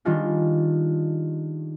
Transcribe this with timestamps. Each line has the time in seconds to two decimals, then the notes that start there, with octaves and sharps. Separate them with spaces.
0.05 D#3 G3 D4 D#4 F4 G#4